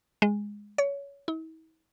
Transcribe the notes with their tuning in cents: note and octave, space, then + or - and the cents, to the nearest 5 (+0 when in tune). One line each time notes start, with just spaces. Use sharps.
G#3 -10
C#5 +20
E4 -45